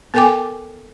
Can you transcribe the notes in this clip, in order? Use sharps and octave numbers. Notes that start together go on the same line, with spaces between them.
B3 A4 A#4 G5 G#5 D6